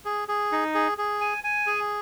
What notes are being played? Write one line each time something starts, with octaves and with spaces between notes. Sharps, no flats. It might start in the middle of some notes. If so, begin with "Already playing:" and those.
G#4
G#4
D#4
G#4
G#4
G#5
G#5
G#4